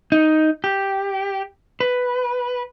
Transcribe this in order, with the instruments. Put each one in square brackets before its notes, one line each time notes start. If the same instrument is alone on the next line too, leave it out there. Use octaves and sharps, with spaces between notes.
[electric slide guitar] D#4
G4
B4